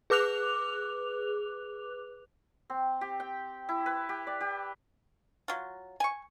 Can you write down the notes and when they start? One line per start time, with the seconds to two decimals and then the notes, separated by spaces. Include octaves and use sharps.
0.10 G#4 B4 D6 F#6 F7
2.70 C4
3.01 G4
3.20 G5
3.69 E4
3.86 B4
4.09 G4
4.27 D5
4.41 G4
5.48 F#3 F4
6.00 G#5 C#6